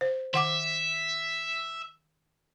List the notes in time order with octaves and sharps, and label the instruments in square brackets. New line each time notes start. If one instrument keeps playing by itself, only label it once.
[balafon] C5
[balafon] D#3 F#5 D6 [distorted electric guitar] E5